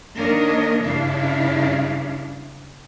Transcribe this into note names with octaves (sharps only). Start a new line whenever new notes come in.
D#3 A#3 D4 A#4 C#5 D#5
G2 C#3 D4 E4 F5